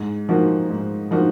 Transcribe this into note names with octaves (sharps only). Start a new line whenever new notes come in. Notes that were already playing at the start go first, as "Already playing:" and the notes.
Already playing: G#2
F3 A#3 D#4 F#4
G#2
F3 A#3 D#4 F#4